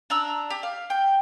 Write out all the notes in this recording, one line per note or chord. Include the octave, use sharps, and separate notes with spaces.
D4 A#5 E6
G4
F5
G5